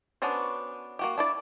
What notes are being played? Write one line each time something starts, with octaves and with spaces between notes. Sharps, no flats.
B3 C#4 D4 F#4 C5
A#3 F#4 G4
D4 E4 D5